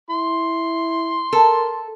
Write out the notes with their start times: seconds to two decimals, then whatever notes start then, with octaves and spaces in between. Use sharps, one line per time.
0.10 E4 C6
1.33 A4 A#4